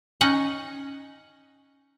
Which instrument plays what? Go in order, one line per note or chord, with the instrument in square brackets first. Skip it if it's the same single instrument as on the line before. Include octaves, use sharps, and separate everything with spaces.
[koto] C#4 D#4 D#5 F#5